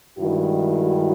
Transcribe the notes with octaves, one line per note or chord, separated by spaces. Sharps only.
G2 D#3 G#3 E4 F#4